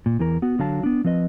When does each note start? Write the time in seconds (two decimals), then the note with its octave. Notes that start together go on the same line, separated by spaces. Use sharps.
0.06 A#2
0.19 E2 E3 A#4
0.42 B3 F#4
0.59 D3 F#3 F5 A5
0.83 B3 D4
1.04 F3 C4 B4 D#5